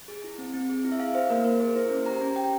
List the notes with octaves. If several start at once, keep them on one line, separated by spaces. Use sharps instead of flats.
G#4
E4
C4
C4
G#4
E4
E5
G#4 F5
E4 C5
A#3 A#4
A#3 A#4
G#4 C5
E4 C5
C#4
G4 A#5
C#4 A#5
G4 G5